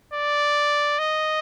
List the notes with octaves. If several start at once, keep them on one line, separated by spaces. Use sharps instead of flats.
D5
D#5